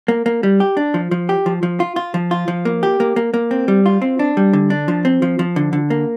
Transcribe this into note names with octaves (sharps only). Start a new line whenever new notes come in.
A#3
A#3
G3
G4
D4
F3
F3
G4
F3
F3
F4
F4
F3
F4
F3
A#3
G4
A#3
A#3
A#3
C4
G3
F4
C4
D4
G3
D3
D4
F3
C4
F3
F3
D3
D3
A#3